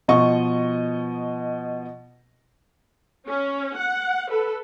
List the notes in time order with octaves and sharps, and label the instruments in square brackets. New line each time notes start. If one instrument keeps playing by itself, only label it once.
[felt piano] B2 F3 D#5 C#6
[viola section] C#4
F#5
A4 B4